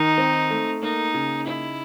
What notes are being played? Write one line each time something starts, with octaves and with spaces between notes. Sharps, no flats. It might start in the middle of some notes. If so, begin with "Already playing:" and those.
Already playing: D#3 D#4
C4
A3
A#3 D#4
C#3
D#4 E4